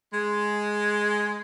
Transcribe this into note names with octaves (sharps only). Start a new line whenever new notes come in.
G#3